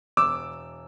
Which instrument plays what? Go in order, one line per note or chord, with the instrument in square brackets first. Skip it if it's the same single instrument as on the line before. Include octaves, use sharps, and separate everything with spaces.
[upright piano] E1 D6 E6